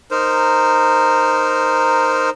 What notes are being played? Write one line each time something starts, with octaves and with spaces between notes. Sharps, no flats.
D#4 A#4 C5